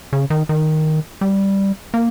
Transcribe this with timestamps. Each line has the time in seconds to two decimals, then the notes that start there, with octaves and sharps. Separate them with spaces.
0.13 C#3
0.30 D#3
0.49 D#3
1.21 G3
1.94 A#3